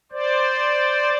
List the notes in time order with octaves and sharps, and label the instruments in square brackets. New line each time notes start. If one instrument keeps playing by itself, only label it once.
[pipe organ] C5 D5